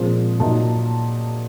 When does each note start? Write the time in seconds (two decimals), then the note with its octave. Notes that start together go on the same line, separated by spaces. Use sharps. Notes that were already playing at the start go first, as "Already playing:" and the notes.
Already playing: A#2 F3 G#3 C4
0.40 A#2 F#3 A#3 D#4 A5